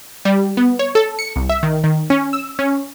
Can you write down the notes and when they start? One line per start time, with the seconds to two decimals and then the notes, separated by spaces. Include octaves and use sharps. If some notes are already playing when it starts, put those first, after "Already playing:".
0.25 G3
0.57 B3
0.79 C#5
0.95 A4
1.19 C#7
1.36 C2
1.49 E5
1.63 D#3
1.84 D#3
2.10 C#4
2.33 E6
2.59 C#4